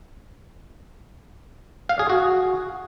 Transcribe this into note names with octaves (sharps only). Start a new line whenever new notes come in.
F5
G#4
F#4